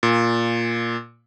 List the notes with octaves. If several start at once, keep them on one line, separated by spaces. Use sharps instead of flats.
A#2